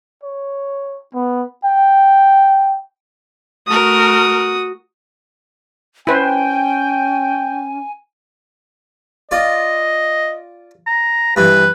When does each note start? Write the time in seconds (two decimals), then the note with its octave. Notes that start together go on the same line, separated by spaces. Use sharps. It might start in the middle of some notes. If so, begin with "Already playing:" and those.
0.23 C#5
1.14 B3
1.65 G5
3.67 A3 F#4 A#4 D#6
6.07 C#4 E4 B4 C5 G5 G#5
9.31 F4 D5 D#5
10.87 A#5
11.36 G2 E3 B4